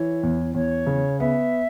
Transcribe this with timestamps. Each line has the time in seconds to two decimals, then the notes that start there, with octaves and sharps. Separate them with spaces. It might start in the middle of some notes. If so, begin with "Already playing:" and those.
Already playing: E3 C#5
0.23 E2
0.54 E2 C#5
0.87 C#3
1.20 B3 E5